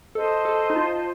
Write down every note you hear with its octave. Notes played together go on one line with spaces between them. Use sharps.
A4 C5 D#5 A5
A4
D#4
F4